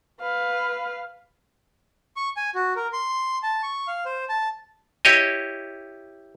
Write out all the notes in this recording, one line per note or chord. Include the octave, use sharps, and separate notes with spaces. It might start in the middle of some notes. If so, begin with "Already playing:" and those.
B4 F5
C#6
G#5
F#4
A#4
C6
A5
C#6
F5
C5
A5
E4 G4 C#5 D#5